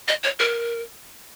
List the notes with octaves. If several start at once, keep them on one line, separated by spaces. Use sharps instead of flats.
D#5
C#5
A#4